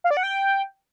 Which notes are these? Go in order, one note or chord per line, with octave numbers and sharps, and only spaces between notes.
F5
D5
F#5
G5